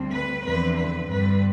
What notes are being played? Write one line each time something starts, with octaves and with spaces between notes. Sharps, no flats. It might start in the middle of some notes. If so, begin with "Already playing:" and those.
Already playing: D2 D3 G3 C4
B4
E2 D3 F3 C4 B4
B4
G2 D3 G3 C4 B4